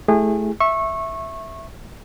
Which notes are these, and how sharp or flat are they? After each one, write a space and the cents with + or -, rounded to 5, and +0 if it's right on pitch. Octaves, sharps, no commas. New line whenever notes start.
A3 -20 E4 +0 G#4 -30
E5 +0 C#6 -20